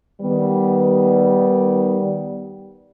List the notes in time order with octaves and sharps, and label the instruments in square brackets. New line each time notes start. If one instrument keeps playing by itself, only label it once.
[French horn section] D#3 G3 B3